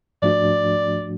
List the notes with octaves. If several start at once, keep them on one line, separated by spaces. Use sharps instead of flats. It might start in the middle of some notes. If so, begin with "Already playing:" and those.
G#2 F3 A3 D4 F#4 D5